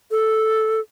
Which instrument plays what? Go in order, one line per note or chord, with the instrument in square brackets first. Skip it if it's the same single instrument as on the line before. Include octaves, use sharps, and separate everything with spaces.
[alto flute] A4